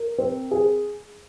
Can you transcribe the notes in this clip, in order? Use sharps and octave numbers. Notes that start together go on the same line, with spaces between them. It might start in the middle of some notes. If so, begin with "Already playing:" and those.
Already playing: A#4
C4
G#4